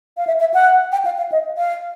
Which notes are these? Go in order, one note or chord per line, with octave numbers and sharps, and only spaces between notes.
F5
E5
E5
F#5
G5
F5
F5
D#5
F5